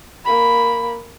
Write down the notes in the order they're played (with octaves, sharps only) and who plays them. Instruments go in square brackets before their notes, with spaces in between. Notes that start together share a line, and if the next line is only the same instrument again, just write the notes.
[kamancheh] A#3 B5